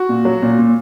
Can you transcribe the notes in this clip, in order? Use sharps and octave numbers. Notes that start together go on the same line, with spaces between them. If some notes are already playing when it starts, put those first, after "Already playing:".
Already playing: F#4
A#2
F#3
A#2
A#2